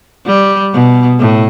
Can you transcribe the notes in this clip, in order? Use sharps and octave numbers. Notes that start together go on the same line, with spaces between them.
G3
B2
A2